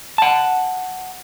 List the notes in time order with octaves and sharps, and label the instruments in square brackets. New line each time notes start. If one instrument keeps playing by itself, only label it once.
[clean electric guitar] F#5 A5